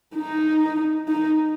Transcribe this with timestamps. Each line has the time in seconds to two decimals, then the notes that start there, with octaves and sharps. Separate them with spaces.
0.15 D#4
1.08 D#4